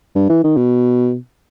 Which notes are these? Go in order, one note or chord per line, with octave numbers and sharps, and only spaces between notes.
G2
E3
D#3
B2